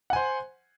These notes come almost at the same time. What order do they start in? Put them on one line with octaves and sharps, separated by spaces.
F#5 G#5 C5